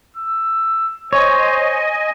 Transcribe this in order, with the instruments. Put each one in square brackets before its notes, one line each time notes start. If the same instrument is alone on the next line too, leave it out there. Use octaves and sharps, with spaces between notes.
[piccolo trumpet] E6
[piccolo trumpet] C5 [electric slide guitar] C#5 [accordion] D#5 G#5